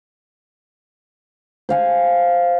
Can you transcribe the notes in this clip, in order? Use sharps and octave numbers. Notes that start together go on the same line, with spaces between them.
C5 F5 G#5